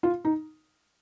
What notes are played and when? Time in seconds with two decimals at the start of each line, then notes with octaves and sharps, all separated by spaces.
0.03 F4
0.25 D#4